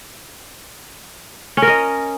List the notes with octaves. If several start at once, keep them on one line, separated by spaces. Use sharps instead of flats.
C#4
A#4
D#5